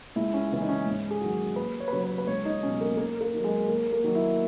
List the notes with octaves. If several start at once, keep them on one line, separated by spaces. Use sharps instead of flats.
C#2 E4
C#4
C#3 E3
D#4
C#4
G#2
G#4
D#3 F#3 F#4
D#2 B4
C#5
B4
C#3 F#3 C#5
B4
B4
C#2 C#5
D#4
B2 F#3 C#4
A#3
D#2 A#3
A#3
D#3 F#3
G#3
D#2 A#3
A#3
D#3 F#3
E4